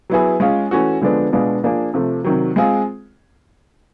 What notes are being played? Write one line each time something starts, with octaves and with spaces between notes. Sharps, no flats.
F#3 B3 E4 G#4
G#3 C#4 F4 G#4
E3 A3 C#4 F#4
D3 F3 G#3 B3 D4
B2 G#3 B3 D4 F4
F3 A#3 D4 F4 G#4
C3 F3 A3
C3 D#3 F#3
G#3 C4 F4 G#4